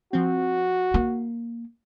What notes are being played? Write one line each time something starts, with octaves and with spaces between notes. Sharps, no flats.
F3 C4 F#4
A#3